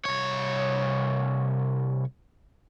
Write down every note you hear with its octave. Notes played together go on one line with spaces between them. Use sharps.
C2 C#5